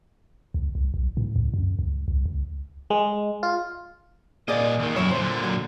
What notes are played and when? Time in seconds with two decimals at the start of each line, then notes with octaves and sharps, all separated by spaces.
0.54 C#2
0.75 C2
0.94 B1
1.17 A2
1.36 C#2
1.54 F#2
1.79 C#2
2.08 C2
2.26 C#2
2.90 G#3
3.43 F4
4.48 A#2 A#3 G#4 D5 D#5
4.79 D#2 D#3
4.96 B1 F#2 F#3 E4 C#5
5.11 A#2 D3 C5
5.44 F#3